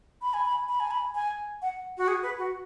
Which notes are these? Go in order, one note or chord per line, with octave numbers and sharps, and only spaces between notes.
B5
G#5
B5
B5
G#5
B5
G#5
F#5
F#4
G#4
B4
F#4